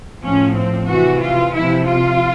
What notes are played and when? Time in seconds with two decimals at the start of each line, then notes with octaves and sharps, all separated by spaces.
0.22 A2 F3 C#4
0.55 C4
0.87 C3 E3 F#4
1.20 F4
1.54 C3 F3 E4
1.86 F4